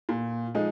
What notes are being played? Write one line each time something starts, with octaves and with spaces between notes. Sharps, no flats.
A#2
F3 G#3 D#4